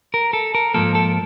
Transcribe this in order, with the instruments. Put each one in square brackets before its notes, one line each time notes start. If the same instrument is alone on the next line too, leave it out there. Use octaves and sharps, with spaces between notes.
[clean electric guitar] A#4
A4
A#4
G#2 F3 A#3 A4
A4